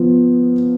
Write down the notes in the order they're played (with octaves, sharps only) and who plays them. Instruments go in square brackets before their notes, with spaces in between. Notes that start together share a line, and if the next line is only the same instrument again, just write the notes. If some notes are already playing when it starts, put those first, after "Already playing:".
Already playing: [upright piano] F3 B3